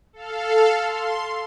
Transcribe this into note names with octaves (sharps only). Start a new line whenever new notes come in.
A4 F5
C6